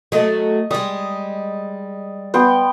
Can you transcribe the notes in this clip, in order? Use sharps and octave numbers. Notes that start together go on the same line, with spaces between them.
F#3 A3 D#5
G3 G#3 D#6
B3 G5 C6